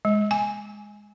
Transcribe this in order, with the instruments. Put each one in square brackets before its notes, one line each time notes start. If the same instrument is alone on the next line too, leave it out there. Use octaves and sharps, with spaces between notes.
[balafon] G#3
G#5